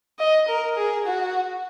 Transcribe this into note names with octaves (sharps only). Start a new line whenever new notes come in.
D#5
A#4
G#4
F#4